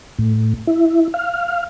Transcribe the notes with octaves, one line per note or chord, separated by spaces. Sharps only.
A2
E4
F5